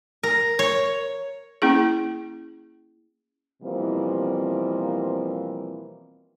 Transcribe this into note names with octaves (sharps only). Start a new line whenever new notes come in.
A#4
C#5
A#3 C#4 E4 G#4
B2 E3 F3 G3 A#3 C4